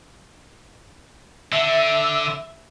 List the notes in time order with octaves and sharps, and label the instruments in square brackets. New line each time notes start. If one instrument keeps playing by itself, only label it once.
[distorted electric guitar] D3 [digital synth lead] E5